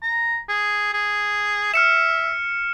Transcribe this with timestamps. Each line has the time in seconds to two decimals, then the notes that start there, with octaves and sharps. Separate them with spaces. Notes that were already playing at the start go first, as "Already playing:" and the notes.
0.02 A#5
0.49 G#4
0.94 G#4
1.74 E5 F6 C#7 E7